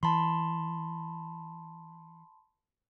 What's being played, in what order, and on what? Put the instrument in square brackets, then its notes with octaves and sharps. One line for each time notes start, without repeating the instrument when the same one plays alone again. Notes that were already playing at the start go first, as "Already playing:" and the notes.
[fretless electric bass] E3 [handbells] A5 B5 C6